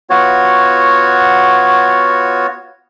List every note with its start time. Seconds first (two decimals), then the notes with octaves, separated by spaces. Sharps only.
0.10 B3 F4 F#4 C#5